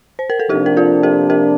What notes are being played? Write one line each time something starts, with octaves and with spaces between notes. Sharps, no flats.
C5
A#4
A4
C3 F3 A#3 D4 D#4 G4
A#4
F4 A4
G4 A#4
G4 A#4